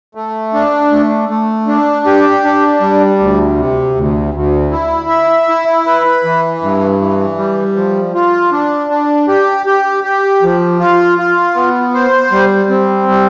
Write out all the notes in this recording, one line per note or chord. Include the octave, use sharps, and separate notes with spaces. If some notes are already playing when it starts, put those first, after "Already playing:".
A3
D4
A3
A3
D4
G4
D4
G3
D2
C3
D2
D2
E4
E5
E4
B4
E3
G2
E3
G3
F3
F4
D4
D4
G4
G4
G4
F3
F4
F4
B3
C5
G3
C4
G3